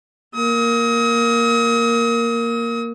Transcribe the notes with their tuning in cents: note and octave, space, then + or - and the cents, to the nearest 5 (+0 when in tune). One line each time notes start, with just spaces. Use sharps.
A#3 +0 D#6 +40